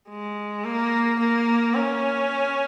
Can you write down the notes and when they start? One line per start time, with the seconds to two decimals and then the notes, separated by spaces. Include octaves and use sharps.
0.09 G#3
0.64 A#3
1.20 A#3
1.75 C#4